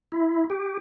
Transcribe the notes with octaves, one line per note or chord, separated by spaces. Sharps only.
E4
G4